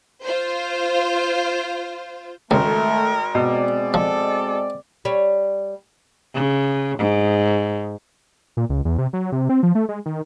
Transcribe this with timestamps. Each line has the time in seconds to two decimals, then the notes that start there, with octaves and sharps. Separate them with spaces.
0.24 F4 C5
2.51 G#1 C#2 A3 A#4
3.35 B2 G#3 C4 D5
3.94 F3 A4
5.05 G3 C#5
6.34 C#3
6.98 G#2
8.57 A#2
8.70 C#2
8.85 E2
8.98 C3
9.13 F#3
9.32 C3
9.49 C4
9.63 F3
9.75 A3
9.89 G#3
10.06 D#3